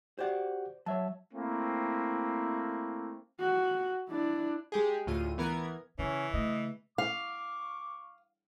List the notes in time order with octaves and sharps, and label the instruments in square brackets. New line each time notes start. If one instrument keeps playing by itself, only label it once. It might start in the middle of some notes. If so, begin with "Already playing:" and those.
[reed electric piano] F#4 G4 F#5 [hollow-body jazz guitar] C5 D5
[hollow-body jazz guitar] F#3 [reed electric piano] C#5 E5 A5
[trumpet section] A3 A#3 C4 E4
[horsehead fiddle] F#4
D4 E4
[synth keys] G#3 G4 G#4
D2 A2 F4 D#7
E3 B3 A#4 G#6
[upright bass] C#3 [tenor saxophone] E3 [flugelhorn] C#4
[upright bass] C#3 A3 [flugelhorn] D#5
[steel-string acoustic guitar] F5 [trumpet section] C#6 D6